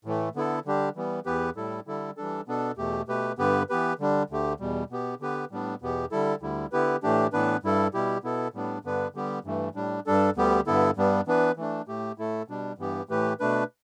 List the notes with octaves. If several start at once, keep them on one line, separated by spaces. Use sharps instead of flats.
A2 E3 A3
D3 B3 E4 A4
D3 G3 D4 G4
E3 G3 B3
E2 E3 B3 G4 B4
A2 G3 E4 A4
D3 G3 E4 A4
E3 G3 D4 A4
B2 B3 D4 A4
E2 B2 A3 G4
B2 A3 G4 B4
G2 D3 B3 G4 B4
E3 B3 G4 B4
D3 G3 D4
D2 D3 A3 G4
E2 B2 G3
B2 B3 G4
D3 B3 G4 B4
A2 G3 B3 D4
E2 B2 B3 G4
D3 G3 E4 A4
D2 D3 G3 E4
D3 B3 E4 G4 B4
A2 E3 A3 D4 G4
A2 E3 B3 D4 B4
G2 G3 E4 A4
B2 G3 E4 G4
B2 B3 E4 A4
A2 G3 B3 D4
G2 D3 B3 D4 B4
D3 G3 B3 G4
G2 E3 A3
A2 G3 D4
G2 G3 D4 A4
D2 D3 G3 B3 G4
G2 D3 B3 E4 A4
G2 G3 B3 D4
E3 B3 D4 B4
E3 A3 D4
A2 A3 G4
A2 A3 E4 A4
B2 G3 D4
G2 E3 B3 G4
A2 E3 A3 G4 B4
B2 A3 D4 B4